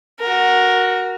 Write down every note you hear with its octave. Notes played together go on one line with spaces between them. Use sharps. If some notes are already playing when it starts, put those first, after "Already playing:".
F#4 A#4